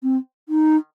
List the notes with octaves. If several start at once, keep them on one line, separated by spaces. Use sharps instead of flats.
C4
D#4